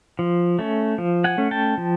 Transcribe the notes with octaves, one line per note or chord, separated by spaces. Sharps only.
F3
A3 C#4
F3
F#5 G#5
A3 C#4
G5 A5
F3